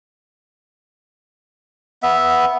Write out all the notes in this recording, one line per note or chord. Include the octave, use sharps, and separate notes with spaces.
B3 E5